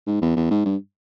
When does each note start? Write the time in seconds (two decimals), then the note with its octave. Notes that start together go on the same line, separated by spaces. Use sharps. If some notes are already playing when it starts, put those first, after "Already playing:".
0.07 G#2
0.21 E2
0.36 E2
0.51 G#2
0.66 G2